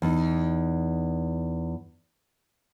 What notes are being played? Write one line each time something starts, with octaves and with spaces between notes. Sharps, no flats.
E2 D#4